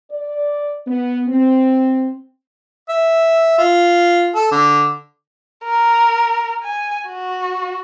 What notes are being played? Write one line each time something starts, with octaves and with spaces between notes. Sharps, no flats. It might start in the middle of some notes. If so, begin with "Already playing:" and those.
D5
B3
C4
E5
F4
A4
D3
A#4
G#5
F#4